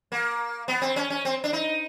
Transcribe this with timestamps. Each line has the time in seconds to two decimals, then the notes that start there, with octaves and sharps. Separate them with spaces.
0.12 A#3
0.68 B3
0.82 C4
0.96 C#4
1.10 C#4
1.25 C4
1.44 D4
1.53 D#4